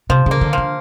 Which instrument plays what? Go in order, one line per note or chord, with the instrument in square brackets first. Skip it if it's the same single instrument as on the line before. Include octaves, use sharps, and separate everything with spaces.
[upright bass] C3 [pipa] F3
[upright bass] C#3 [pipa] A#3
[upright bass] D3
[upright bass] D3 [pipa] F3